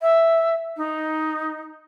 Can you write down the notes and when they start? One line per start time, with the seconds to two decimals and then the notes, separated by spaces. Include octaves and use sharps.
0.01 E5
0.77 D#4